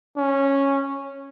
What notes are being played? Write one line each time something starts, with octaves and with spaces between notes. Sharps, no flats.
C#4